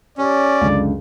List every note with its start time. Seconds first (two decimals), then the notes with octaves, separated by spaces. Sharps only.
0.18 C#4 G4 C#5 D5
0.61 C#2 F#2 D3